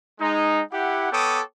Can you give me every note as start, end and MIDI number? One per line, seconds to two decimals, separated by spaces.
0.20 0.61 56
0.20 0.61 63
0.72 1.11 64
0.72 1.11 67
0.72 1.11 78
1.11 1.42 59
1.11 1.42 69
1.11 1.42 73
1.11 1.42 79
1.11 1.42 86
1.11 1.42 87